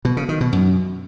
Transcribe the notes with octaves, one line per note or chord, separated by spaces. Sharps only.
B2
C#3
D#3
B2
F#2